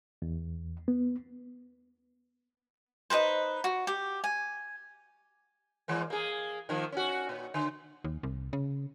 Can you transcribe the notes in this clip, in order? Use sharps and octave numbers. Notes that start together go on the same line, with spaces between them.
E2
B3
D#4 G4 B4 C5
F#4
G4
G#5
E3 G#3 A#3
A#3 G#4
D#3 F3 A#3
C#4 F#4
A#2
D3
D#2
C2
C#3